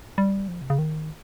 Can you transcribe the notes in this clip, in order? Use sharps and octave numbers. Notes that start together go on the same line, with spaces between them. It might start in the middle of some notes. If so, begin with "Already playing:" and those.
G3
F3
C3
C#3
D#3